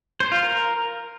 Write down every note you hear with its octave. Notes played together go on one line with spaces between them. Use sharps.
C5
F4
A#4